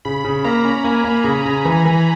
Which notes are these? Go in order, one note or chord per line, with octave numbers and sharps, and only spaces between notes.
C#3 B5
C#3
A#3 A#5
C#4
A#3 G#5
A#3
C#3
C#3
E3
E3